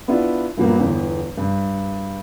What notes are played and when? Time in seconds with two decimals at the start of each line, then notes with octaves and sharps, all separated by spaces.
0.08 B3 D4 E4 F4
0.58 G2 A#2 F#3 A#3 B3
0.79 G1 E2
1.38 G2